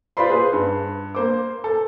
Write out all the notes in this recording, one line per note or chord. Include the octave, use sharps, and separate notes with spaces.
F4 B4 C5 D5 B5 C6
G#4 B4 C5
G2
A#3 C5 D6
A4